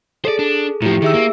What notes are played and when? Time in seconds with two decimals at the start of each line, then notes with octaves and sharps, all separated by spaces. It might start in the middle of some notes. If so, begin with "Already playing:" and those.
0.25 G#4 A4 C5 D5
0.39 D4
0.82 A2 F3 E4 G4
1.02 D#3 G#4 E5 E6
1.14 A#3